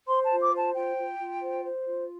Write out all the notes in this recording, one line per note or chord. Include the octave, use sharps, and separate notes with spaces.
C5 C6
A5
F4
D6
C5
A5
F4 G5
F4
F4
C5
C5
F4